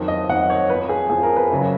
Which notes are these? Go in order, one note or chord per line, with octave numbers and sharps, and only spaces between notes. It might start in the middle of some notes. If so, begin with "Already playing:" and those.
Already playing: F2 D#3 F#3
D#5
F2 D#3 F#3 F#5
C#5
F2 F3 B4
G#4
F2 F3 G#4
A#4
B4
F#2 C#3 F#3